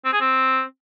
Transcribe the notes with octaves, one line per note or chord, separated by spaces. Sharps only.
C4
G#4
C4